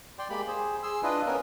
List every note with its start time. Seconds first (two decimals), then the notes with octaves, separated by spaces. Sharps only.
0.19 D5 G5 C6
0.30 G#3 A#3 G4 B5
0.47 G#4 C5
0.83 G#4 C6 E6
1.03 D4 E4 F4 B4 D#5
1.26 B3 C#4 A#4